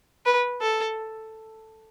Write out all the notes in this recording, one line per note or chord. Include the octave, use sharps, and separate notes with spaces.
B4
A4